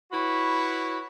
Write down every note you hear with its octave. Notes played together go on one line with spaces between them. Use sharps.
E4 F#4 B4 C#5 B5